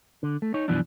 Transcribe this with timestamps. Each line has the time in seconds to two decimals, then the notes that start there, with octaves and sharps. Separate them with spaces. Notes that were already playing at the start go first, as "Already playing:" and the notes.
0.23 D3
0.42 A3
0.54 D#4 C#5
0.68 F#2 B2 E3 F3 D4